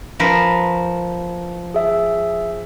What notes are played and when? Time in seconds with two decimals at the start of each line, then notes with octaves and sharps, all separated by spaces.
0.20 F3 A#4 B4
1.74 G#4 E5